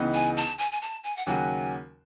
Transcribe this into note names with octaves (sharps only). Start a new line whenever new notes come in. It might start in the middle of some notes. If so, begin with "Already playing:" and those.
Already playing: C#2 C#3 E3 B3 D#4
G#5
A5
G#5
G#5
A5
G#5
F#5
D#2 C#3 F#3 C#4 F#4 G#5